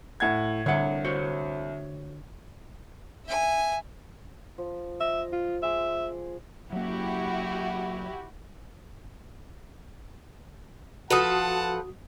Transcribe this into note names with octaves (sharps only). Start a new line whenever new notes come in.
A2 F#5 G#6
C2 D3 C#5 F#5
F#4 C5 C#5
E5 G#5
F3
D#5 E5
F4
G#3 G#4 E5 D6
F#3 A#3 E4 F#4 G4
F3 F#4 A4 B4 F#5 A5 D#6